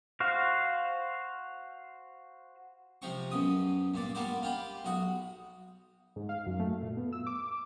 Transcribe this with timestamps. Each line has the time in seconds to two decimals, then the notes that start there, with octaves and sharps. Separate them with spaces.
0.20 F#4 C5 F5
3.02 C3 F3 C4 C#6
3.31 F#2 B2 D#6
3.94 G2 A#2 D5
4.15 G3 A#3 B3 C5 D5
4.43 F4 G4 B5
4.85 B1 F#4 D#6
6.16 G#2
6.29 F5
6.46 F#2
6.60 A3
6.83 A#2
6.97 B3
7.13 E6
7.27 D6